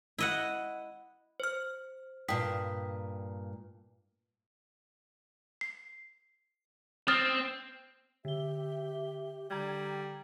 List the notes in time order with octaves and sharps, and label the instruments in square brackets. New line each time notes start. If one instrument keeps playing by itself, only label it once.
[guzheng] E4 D#5 F#5
[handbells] C5 F6
[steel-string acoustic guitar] G2 A#2 [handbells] G5 D#6 B6
[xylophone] C7
[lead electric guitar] C4 [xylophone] D#6 F6 A6
[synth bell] D3 G7 [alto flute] G4 [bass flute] E5
[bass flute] D3 [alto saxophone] G3 [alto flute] G5 [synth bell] A#5 G#6